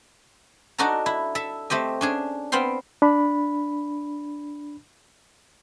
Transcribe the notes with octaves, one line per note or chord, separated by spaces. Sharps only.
D4 D#4 F#4 A4 D#5 A#5
E4
A4 E5
A3 C4 G4 D#5
C#4 D4 G#4
B3 C4 F5 G5 C6
D4 B5